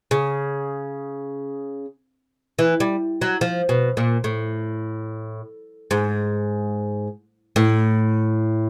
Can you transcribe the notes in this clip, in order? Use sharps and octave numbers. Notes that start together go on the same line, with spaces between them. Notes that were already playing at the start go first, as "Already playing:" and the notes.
C#3
E3
G3
F#3
F3
B2
A#2
A2
G#2
A2